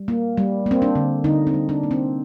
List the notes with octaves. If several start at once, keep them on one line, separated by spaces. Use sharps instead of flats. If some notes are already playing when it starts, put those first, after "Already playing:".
Already playing: G3
A#3
G3
A#3 C4
D4
D3
D3 D#4
C4
G3
D4
A#3
C4